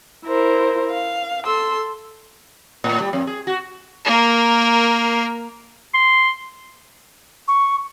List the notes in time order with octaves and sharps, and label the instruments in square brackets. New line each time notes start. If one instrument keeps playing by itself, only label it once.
[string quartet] E4 A#4 C5
F5
A4 C6 E6
[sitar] A2
G3
F2
G#4
F#4
[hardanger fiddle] A#3 A#4
[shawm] C6
[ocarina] C#6